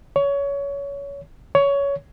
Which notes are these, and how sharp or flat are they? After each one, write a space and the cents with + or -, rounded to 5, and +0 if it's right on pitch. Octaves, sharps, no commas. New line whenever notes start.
C#5 +20
C#5 +15